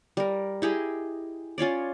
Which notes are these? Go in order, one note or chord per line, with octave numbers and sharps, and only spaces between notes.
G3 A#4
E4 G4 G#4 D#5
C#4 F4 C#5 D5